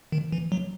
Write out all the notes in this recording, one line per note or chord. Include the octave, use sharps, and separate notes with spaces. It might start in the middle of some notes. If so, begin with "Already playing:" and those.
D#3
E3
F#3